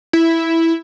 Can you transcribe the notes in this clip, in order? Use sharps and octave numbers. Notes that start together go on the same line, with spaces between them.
E4